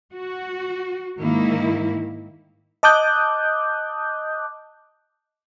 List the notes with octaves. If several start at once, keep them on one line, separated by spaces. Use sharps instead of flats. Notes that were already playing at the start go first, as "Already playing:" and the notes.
F#4
G#2 D#3 A#3 E4
D#5 A5 D6 D#6 F#6 G6